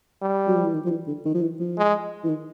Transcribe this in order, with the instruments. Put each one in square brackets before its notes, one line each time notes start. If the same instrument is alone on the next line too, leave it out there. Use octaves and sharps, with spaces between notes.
[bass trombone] G3
[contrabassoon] F#3
F3
E3
D#3
F3
E3
D3
D#3
F3
E3
F3
[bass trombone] G#3
[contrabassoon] E3
D#3